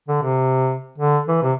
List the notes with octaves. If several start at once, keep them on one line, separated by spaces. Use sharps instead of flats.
D3
C3
D3
E3
C3